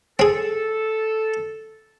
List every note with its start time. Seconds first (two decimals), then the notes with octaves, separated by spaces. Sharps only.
0.19 C4 G#4 A4